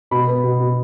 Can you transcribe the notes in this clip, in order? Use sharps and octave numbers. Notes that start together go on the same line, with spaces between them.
B2 B5
B3
B2
B2